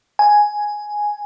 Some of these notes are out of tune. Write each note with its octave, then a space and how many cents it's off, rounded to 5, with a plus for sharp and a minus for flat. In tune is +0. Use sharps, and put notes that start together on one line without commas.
G#5 +5